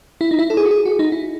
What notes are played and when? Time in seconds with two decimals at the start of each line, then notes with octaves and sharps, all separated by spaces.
0.21 E4
0.31 D#4
0.39 E4
0.50 A4
0.57 G#4
0.66 F#4
0.71 G#4
0.85 F#4
0.99 D#4
1.12 E4